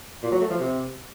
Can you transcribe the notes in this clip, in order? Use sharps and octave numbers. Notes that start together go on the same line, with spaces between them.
A#2
F#3
A3
F3
C3